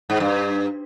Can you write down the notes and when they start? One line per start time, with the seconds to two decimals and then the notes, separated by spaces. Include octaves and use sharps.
0.10 G#2
0.20 G2